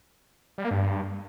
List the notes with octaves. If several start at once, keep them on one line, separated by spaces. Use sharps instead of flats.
G3
A#3
G2